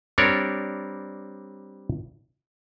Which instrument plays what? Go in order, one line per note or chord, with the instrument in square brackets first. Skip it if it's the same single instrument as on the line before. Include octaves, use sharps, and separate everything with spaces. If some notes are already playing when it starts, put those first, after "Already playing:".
[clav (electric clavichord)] G3 C4 D4 A#4 C#5 D5